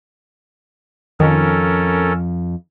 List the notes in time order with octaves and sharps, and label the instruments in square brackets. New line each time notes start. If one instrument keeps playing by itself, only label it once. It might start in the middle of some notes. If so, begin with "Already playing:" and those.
[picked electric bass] F2 F3 [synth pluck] D#3 [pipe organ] C#4 A4 A#4